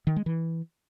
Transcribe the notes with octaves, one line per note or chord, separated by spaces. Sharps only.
D#3
G#3
E3